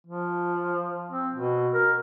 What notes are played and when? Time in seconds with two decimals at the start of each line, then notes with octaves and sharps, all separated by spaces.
0.07 F3
1.11 C4
1.35 B2
1.74 A#4